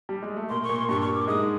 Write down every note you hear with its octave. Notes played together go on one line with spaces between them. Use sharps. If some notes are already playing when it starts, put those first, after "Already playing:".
G3
G#3
A3
A#2 A#3 C6
C#6
A#2 A#3
C6
G2 G3 C#6
C#6
D6
G#2 G#3 D#6